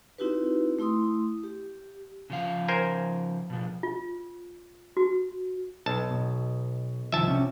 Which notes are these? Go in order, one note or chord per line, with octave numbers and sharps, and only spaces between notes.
C4 D#4 E4 F#4 G4 B4
A3 E4 C6 D#6
G4
C#3 F3 F5
A#4 C5 G#5
B2 F3
F4
F#4
B1 A5
B2
C2 D#3 F3 E5 A5
C3 C#4 D4